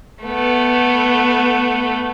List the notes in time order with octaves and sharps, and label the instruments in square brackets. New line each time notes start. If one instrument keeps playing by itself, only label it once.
[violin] A3 B3